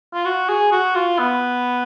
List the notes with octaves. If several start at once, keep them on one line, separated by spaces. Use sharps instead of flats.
F4
F#4
G#4
F#4
F4
B3